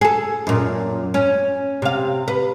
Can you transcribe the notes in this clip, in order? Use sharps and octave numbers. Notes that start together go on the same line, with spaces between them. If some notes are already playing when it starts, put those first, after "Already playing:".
G#4 A4
F#2 A#2
C#4
C3 F5
B4